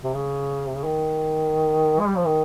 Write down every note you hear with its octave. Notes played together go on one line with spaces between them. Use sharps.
C3
C#3
C3
C#3
D#3
G#3
G3
F3
D#3